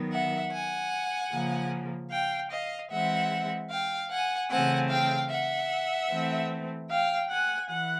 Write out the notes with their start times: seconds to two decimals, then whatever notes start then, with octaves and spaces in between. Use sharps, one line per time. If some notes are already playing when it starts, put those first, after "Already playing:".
Already playing: D#3 F#3 B3
0.12 E5 F#5
0.52 F#5 G#5
1.32 C#3 F3 A#3
2.11 F5 G5
2.51 D#5 F5
2.91 E3 G#3 C4 E5 F#5
3.71 F5 G5
4.11 F#5 G#5
4.50 C#3 E3 A3 C4 F#5 G#5
4.90 F5 G5
5.30 E5 F#5
6.10 E3 A3 C4
6.90 F5 G5
7.30 F#5 G#5
7.69 E3 F#5